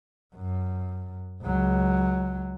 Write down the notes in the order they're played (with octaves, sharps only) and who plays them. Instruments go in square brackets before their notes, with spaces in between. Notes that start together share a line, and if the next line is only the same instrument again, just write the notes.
[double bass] F#2
C#2 F#3